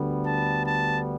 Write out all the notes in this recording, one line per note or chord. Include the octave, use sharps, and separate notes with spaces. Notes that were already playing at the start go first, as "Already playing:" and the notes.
Already playing: D2 D3 G3 B3
A5
A5